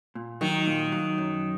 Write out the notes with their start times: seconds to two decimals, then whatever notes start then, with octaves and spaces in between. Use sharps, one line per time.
0.15 A#2
0.41 D#3 F#3
0.67 A#2
0.92 F#3
1.18 F#2